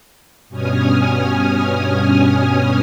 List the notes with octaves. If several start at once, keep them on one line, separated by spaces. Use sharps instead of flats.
G2 B2 C#4 G#5 D#6 F6